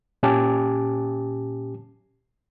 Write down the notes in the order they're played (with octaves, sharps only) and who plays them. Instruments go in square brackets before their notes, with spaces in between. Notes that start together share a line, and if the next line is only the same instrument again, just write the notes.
[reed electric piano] A#2 C#4 G4 G#5 A5 D6